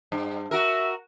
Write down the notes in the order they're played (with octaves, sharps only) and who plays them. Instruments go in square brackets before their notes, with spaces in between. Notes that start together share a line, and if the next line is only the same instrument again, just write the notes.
[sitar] G2
[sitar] F#4 A#4 [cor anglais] E5